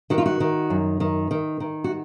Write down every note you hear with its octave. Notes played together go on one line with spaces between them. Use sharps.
D#3 F#4
F4
F#4
D#3
F#2
D#3
D#3
D#3
F#4